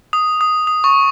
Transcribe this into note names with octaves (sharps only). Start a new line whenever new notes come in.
D#6
D#6
D#6
C#6